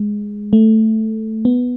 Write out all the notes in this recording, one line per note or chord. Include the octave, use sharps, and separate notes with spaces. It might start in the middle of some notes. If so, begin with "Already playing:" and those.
Already playing: G#3
A3
B3